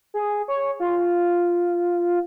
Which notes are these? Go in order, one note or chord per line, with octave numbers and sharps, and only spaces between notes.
G#4
C#5
F4